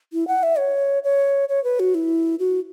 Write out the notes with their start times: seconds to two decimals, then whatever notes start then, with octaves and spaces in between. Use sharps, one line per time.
0.13 E4
0.28 F#5
0.43 E5
0.58 C#5
1.04 C#5
1.49 C#5
1.64 B4
1.80 F#4
1.95 E4
2.39 F#4